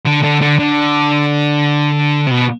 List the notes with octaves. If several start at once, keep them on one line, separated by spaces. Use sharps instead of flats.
D3
D3
D3
D3
C3
B2